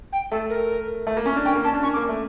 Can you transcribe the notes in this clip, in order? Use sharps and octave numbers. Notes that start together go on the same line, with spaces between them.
G5
A3 A4
A#4
A3
A#3
C#4
D4
C#4 G5
A#3
C#4 A5
D4
C#4 C#6
D6
A#3
A3